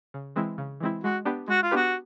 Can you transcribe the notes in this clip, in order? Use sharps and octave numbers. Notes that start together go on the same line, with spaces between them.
C#3
E3 G#3 C4 E4
C#3
E3 G#3 C4 E4
G#3 F#4
B3 D4 G4 B4
G#3 F#4
F4
B3 D4 F#4 G4 B4